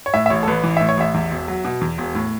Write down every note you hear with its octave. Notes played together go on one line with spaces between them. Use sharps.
C#5
A2 E5
E5
A1 C#5
A4
A1 B4
E3
A2 E5
C#5
A1 E5
E2
E1
F#3
B2
E2
E1
A2